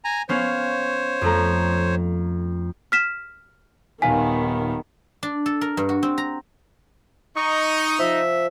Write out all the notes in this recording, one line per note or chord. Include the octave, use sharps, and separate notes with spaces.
G#5 A#5
B3 C#4 C5 C#5 F5
F2 A3 A#5
F6 B6 E7
D#1 D#3 B3 F5 G#5 B6
D4
A4
A#4
G2
F#4
C4
A#5
D#4 C#6
F3 E5